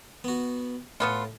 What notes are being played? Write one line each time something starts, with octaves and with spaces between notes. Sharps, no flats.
B3 F#4
A2 A3 B3 F4